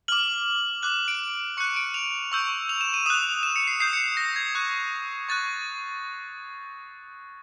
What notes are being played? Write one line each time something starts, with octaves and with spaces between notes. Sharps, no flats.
D6 F6 F#7
D6 F#6 F#7
D7
C#6 F#6 C#7
D7
F7
C#6 E6 G6
F7
E7
D#7
D#6 F#6 E7
E7
C#7
C7
D#6 G6 C7
C#7
A#6
G#6
C#6 F#6
C#6 F#6 A6